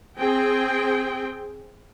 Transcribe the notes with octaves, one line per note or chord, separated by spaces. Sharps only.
C4 G#4 G5